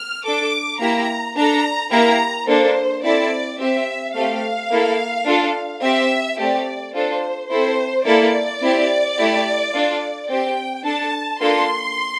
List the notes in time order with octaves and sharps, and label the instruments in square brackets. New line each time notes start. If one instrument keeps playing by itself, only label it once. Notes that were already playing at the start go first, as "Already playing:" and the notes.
Already playing: [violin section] F6
D4 A4 D6
A#3 E4 G4 A#5
D4 A4 A#5
A#3 E4 G4 A#5
A#3 D4 A4 C5
C4 E4 A4 D5
C4 G4 E5
A3 C4 G4 F5
A#3 E4 A4
D4 F4 A4
C4 G4 E5
A3 C4 G4 D5
D4 F4 A4 C5
C4 E4 A4 C5
A#3 E4 A4 D5
C4 E4 G4
A3 E4 G4
D4 F4 A4
C4 G4 G5
D4 A4 A5
A#3 D4 F4 A4 C6